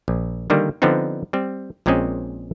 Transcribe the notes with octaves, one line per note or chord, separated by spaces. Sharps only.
A#1
D3 D#3 G3 A#3
D3 F3 B3 C4 D4 D#4
G3 C4
A#1 A#2 G#3 C4 C#4 D#5